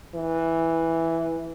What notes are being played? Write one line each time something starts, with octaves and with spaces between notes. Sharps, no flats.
E3